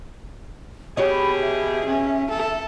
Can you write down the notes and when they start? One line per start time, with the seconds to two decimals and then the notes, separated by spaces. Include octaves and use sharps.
0.97 B2 G4 G#4 C#5 D#5 B5
1.40 E5
1.86 C#4
2.31 A4